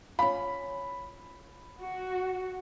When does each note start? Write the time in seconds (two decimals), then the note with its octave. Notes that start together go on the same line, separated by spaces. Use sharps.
0.19 C#4 F4 B5
1.80 F#4